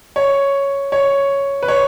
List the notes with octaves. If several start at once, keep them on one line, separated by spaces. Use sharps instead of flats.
C#5
C#5
B4
C#5